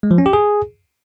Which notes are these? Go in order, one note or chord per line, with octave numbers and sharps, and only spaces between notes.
G#3
F3
C#4
G4
G#4